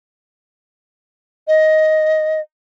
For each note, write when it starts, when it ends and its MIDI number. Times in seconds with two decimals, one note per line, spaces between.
1.48 2.41 75